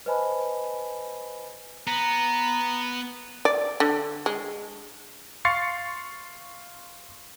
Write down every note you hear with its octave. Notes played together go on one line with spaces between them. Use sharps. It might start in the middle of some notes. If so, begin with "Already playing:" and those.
B4 C5 D#5 G#5 A5 B5
B3 A#5
D5
D3
G#3
F5 C6 C#6 A6 C7 C#7